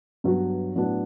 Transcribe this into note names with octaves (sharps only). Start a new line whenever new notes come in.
G2 F#3 B3 F#4
A2 F#3 B3 D4 F#4